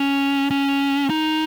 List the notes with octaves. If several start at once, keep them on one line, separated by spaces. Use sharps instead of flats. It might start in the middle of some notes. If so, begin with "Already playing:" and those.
Already playing: C#4
C#4
D#4